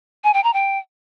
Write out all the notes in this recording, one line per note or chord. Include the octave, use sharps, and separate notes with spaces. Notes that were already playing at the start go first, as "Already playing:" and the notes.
G#5
G5
A#5
G5